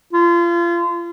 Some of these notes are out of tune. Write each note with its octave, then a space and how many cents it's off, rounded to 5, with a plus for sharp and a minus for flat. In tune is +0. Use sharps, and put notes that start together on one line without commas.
F4 -30